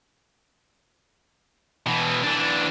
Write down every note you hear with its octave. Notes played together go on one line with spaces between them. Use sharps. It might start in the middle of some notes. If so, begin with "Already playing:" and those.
B2 E3
E3 D4